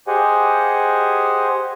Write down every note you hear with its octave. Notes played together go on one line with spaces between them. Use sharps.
G4 G#4 C5 D#5 F#5 G#5